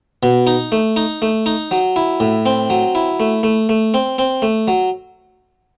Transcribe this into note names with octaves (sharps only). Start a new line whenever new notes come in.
B2
D#4
A3
D#4
A3
D#4
F#3
E4
A2
C4
F#3
E4
A3
A3
A3
C4
C4
A3
F#3